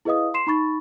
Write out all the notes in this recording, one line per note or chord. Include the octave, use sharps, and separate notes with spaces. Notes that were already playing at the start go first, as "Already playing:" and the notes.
E4 G#4 B4 D#5 F5 D#6
C6 C7 E7
D#4 B5 C#6 A6